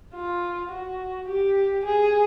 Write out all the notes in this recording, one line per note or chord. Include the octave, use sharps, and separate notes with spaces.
F4
F#4
G4
G#4